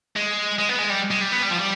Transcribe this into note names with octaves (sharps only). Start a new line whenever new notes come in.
G#3
G#3
B3
G#3
G3
G#3
G3
B3
G3
F3
G3